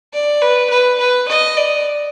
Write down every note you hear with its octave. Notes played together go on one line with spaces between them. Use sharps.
D5
B4
B4
B4
D#5
D5